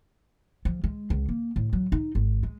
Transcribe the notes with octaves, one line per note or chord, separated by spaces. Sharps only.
F3
G#3
C#2
A#3
A2
F#3
D#4
G#1
G#3